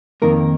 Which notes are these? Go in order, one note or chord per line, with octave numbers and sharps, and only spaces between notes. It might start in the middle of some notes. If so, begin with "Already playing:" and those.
F2 D#3 A#3 A#4